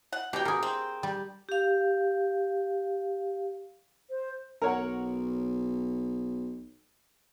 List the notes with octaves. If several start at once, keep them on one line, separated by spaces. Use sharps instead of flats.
F#5
B2 G4 G5 A#5
B2 G#4 A#4
C4
G3
G4 F5
C5
B1 A#4 C#5 F#5